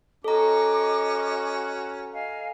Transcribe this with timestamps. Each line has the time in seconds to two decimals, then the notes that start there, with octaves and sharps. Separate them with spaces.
0.24 C#4 F#4 A4 D#5 A#5 D6
2.13 D#5 F5 G#5